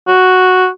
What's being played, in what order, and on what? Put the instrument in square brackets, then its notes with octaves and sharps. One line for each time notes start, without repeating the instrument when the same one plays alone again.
[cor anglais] F#4